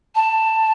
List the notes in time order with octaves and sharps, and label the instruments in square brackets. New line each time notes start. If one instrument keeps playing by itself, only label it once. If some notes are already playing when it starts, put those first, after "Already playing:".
[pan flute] A5